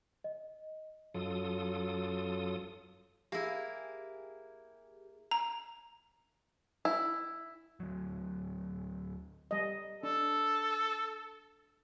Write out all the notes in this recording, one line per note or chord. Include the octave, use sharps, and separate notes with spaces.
D#5
F#2 F#3 F4 A4 D#6
A#3 E4 G4 G#4
A#5
E4
D2 F#3
G3 D#5
D4 A4